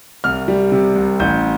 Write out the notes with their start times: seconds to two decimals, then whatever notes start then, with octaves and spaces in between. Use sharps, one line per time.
0.24 C2 F6
0.48 G3
0.72 C3
0.95 C2
1.20 A1 G6